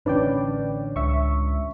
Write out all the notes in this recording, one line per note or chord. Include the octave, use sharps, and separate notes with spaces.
A1 D3 C#4 D4 B4 D5 G5
C#2 E5 C#6